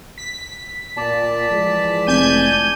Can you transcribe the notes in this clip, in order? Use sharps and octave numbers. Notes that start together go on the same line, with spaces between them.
B6
A#2 D5 A5
E3 F3 G#3
F1 G#5 G6 D#7